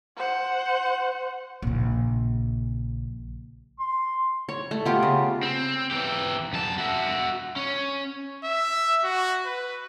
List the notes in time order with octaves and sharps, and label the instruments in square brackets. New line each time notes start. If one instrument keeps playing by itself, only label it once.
[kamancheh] C5 F#5
[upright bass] A#1 C#3
[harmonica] C6
[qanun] C#5
A3
B3 F4 G4
C#3
[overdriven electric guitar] C4
E3 G4
F#2 A5
F#4 E5
C#4
[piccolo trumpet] E5
F#4
B4